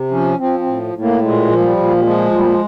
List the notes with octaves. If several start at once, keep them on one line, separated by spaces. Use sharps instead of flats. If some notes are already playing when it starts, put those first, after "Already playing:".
Already playing: C3
F3 C#4
F3 C4
C4
A2
A2
A#3
A#2 G#3
F3
G#3
G3
A#2
G3
F3 G#3
A#2 G3
G#3